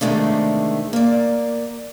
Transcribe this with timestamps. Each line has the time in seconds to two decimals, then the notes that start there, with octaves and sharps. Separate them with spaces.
0.01 E2 C3 D#3 G#3 A3 D4
0.93 A#3 D5